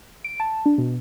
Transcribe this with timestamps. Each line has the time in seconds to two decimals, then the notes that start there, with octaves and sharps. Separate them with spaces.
0.24 D7
0.40 A5
0.66 D4
0.78 B2